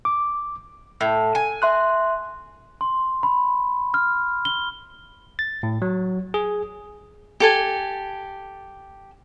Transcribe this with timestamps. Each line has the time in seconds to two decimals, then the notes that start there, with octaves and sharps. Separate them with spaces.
0.05 D6
1.01 A2
1.35 G#5
1.62 E5 C6 F#6
2.81 C6
3.23 B5
3.94 F6
4.45 G7
5.39 A6
5.63 A2
5.82 F#3
6.34 G#4
7.40 G4 A4 G#5